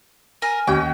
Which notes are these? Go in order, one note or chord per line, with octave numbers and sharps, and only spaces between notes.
A#4 G#5
D#2 C#4 F#4 G5